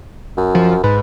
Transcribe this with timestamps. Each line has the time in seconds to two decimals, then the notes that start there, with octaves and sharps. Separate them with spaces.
0.38 F#2
0.55 F3
0.83 G#2 B4